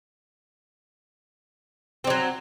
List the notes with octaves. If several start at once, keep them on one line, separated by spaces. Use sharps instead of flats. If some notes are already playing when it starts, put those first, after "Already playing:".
F#3 G3 C4